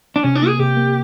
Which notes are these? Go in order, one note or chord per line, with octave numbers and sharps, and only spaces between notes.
D4
C3 C#4
D4
A#3
G#4
C3 G4
A#3